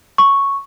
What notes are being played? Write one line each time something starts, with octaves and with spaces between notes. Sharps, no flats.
C#6